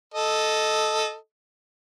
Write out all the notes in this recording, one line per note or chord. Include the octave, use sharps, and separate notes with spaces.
A4 D#5